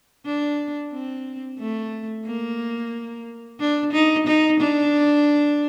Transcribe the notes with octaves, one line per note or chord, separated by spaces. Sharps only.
D4
C4
A3
A#3
D4
D#4
D#4
D4